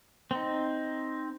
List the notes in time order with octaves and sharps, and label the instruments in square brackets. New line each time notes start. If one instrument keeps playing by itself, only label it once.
[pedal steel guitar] C4 D#4